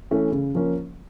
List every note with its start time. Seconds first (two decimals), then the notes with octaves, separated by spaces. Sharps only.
0.11 E3 A3 C#4
0.32 C#3
0.55 F3 A#3 C#4